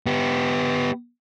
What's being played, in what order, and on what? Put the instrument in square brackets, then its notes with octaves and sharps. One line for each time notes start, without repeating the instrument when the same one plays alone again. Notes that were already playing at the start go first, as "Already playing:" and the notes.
[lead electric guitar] B3 G4